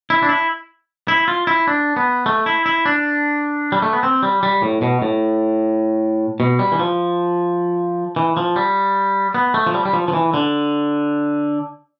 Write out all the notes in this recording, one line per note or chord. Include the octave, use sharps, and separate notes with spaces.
E4
D4
E4
E4
F4
E4
D4
B3
A3
E4
E4
D4
G3
A3
B3
C4
G3
G3
A2
B2
A2
B2
G3
E3
F3
E3
F3
G3
B3
A3
F3
G3
G3
F3
F3
E3
D3